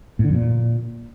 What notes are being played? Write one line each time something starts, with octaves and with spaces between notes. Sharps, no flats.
A2
D3
F2
A#2